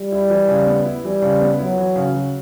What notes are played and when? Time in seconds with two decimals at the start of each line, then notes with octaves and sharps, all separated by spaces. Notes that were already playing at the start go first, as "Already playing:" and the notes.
Already playing: G3
0.12 E4
0.30 E3
0.48 C#3
0.66 B3
0.86 E4
1.04 E3 G3
1.22 C#3
1.41 B3
1.59 F#3 E4
1.78 E3
1.96 C#3
2.14 F#3